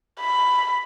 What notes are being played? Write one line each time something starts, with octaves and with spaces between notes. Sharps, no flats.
B5